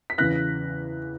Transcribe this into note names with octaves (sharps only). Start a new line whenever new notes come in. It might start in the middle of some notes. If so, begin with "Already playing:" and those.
B6
E2 C#3 E3 F#6 A#6